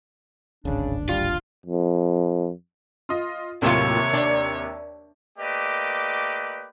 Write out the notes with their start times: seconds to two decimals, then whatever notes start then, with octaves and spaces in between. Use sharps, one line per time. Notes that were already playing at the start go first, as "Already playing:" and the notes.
0.65 D1 G#1 C#3 D4
1.09 G3 F4
1.66 F2
3.09 F4 D#5
3.62 D#2 A2 C3 F#3 F4 C#5 E7
4.13 D4
5.38 A3 A#3 G4 B4 D5 D#5